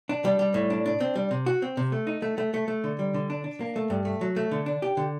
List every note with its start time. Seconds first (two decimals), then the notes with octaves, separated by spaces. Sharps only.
0.09 D4
0.25 G3
0.39 G3
0.54 A2
0.70 D4
0.86 D4
1.00 C4
1.16 G3
1.31 C3
1.46 F#4
1.62 C4
1.77 C3
1.92 A3
2.07 D#4
2.22 A3
2.38 A3
2.54 A3
2.68 A3
2.84 D3
2.99 G3
3.14 D3
3.30 D4
3.44 D4
3.60 A#3
3.76 A3
3.90 G2
4.05 A3
4.21 F#3
4.36 A3
4.51 D3
4.66 D4
4.82 G4
4.97 D3